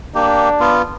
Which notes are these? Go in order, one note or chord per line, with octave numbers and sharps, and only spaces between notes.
A#3 D4 G4
B3 F4